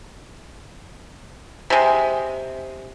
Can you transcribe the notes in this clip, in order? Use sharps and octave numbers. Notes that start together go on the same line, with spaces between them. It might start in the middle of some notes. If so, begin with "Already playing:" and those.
C3 G#3